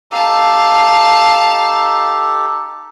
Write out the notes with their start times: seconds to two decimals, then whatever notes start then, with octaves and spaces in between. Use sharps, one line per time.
0.12 D#4 G4 A4 F5 A5